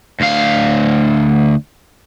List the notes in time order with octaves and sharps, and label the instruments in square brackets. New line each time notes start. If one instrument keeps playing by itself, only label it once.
[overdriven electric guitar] D2 F5